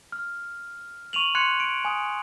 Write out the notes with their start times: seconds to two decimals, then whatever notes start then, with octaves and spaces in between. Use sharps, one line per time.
0.12 F6
1.13 C#6 D#7 F7 F#7
1.35 C6 F#6 G#6 C#7
1.60 D7
1.85 G#5 D#6